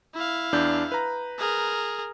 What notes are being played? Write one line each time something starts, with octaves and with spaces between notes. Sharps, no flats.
E4 F5
E2 D4 G6
B4 A#5
G#4 A#4